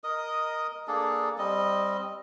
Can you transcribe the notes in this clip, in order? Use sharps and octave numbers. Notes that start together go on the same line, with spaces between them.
A#4 D#5 D#6
A#3 D4 G#4 A4
G3 C4 D#5